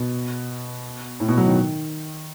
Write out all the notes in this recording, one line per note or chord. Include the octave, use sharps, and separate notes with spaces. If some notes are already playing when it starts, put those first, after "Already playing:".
Already playing: B2
A2
B2
F#3
D#3